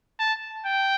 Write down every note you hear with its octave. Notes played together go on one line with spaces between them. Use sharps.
A5
G5